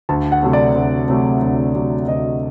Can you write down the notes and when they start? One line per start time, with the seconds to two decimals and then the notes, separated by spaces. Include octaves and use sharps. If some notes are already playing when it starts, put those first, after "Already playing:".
0.09 D2 A5
0.32 F#5
0.42 C3 F#3 A3
0.53 D5
0.75 D2
1.08 C3 F#3 A3
1.42 D2
1.75 C3 F#3 A3
2.08 D2 D#5